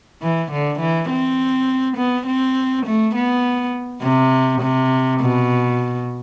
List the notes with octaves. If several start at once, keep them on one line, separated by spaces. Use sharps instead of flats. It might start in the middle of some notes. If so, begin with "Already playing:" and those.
E3
D3
E3
C4
B3
C4
A3
B3
C3
C3
B2